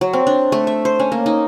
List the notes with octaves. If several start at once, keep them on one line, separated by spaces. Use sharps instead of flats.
F#3
C4
D4
A3
E5
C5
C#4
A#3
D#4